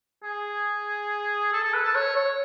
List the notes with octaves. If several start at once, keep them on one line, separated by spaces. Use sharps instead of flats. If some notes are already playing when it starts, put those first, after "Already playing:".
G#4
A4
A4
B4
A4
C#5
C#5